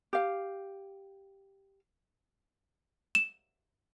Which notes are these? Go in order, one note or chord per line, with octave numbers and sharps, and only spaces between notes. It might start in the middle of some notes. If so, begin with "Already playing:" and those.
G4 F5
E7